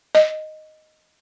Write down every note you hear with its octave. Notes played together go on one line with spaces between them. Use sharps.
D#5